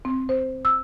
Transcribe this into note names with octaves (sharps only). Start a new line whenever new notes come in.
C4
C5
E6